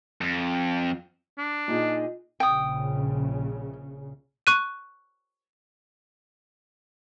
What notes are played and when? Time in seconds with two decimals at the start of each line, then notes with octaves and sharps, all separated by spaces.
0.21 F2
1.38 D4
1.68 A#2 D#4 G#4
2.40 A#1 C#3 G5 D#6
4.47 C#6 F#6 D#7